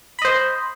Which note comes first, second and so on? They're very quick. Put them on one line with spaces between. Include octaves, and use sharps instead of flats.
B5 D#5 C5